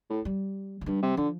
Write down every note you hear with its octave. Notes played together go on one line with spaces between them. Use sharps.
A2
G3
F3
G2 G3
C3
D3 F3